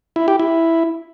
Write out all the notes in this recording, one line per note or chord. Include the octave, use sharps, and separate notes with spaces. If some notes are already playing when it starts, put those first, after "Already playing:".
E4
G4
E4